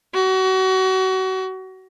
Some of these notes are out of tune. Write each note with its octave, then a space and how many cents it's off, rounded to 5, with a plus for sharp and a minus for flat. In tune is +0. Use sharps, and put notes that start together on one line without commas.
F#4 +30